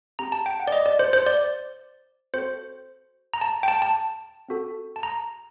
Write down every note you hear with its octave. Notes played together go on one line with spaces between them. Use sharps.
C4 G4 A#5
A5
G5
F#5
D5
D#5
D5
C5
C5
D5
C4 F#4 A4 C5
A#5
A5
G5
A5
A5
C4 F#4 A4
A5
A#5